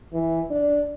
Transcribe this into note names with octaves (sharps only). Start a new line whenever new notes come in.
E3
D4